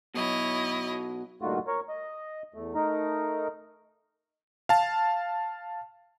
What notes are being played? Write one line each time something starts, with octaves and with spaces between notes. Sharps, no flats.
B2 F#3 E4 C#5 D#5
G2 A#2 D#3 A3 F4 F#4
A#4 C#5
D#5
E2 A3
A3 D#4 A#4
F5 A5